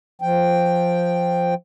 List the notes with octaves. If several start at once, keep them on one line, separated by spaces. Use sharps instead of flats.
F3 G5